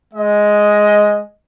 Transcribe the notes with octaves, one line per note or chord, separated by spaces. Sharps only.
G#3 D#5